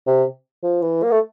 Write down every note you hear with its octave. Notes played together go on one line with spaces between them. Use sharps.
C3
F3
E3
A#3
A3